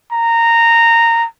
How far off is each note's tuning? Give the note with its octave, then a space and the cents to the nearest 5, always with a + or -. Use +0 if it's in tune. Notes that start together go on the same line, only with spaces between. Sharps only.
A#5 -15